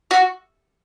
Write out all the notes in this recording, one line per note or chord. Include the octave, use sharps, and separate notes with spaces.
F#4